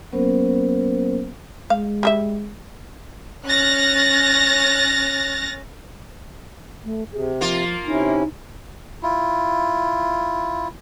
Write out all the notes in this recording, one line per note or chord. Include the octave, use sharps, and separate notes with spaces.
F#3 A#3 B3 C#4 A#4 C5
G#3 F5
G3 G#4 E5
C#4 F6 F#6 A6 A#6
A3
C3 G#4
F3 A#3 F4
C3 C#4 D#4 E4
E4 F4